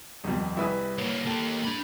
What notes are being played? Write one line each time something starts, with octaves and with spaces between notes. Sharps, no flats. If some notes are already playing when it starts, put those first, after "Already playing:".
D#1 F2 D#3 G3
C2 E4 G#4 B4 D#6
A#3 C#4
A#3 G4 A4 A5
D4 B5